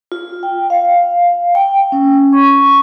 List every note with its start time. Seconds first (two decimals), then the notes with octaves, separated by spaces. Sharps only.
0.12 F4
0.43 G5
0.70 F5
1.55 G5
1.92 C#4
2.33 C#6